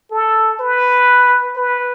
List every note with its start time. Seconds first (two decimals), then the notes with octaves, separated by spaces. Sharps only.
0.11 A4
0.60 B4
1.56 B4